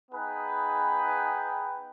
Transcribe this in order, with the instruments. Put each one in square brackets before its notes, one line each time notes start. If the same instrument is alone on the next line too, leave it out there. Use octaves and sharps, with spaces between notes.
[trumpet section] B3 D#4 G#4 B4 G5